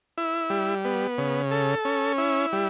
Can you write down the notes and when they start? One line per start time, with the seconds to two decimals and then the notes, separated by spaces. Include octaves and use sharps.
0.18 E4
0.50 G3
0.85 B3
1.18 C#3
1.51 A4
1.85 C#4
2.18 E4
2.53 G3